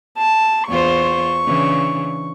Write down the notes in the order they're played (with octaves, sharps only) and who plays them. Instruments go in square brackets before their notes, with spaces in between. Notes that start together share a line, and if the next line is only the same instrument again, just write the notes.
[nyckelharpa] A5
[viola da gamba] E2 F4 C5 [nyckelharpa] C#6
[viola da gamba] C#3 E3 D4